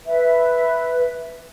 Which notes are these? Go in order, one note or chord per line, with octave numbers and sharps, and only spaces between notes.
B4 E5